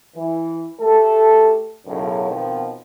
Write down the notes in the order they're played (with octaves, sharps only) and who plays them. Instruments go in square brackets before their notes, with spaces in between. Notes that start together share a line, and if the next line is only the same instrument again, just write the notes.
[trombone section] E3
A3 G4 A4
B1 F#2 A2 C#3
B2 D#3 F3 B3 C4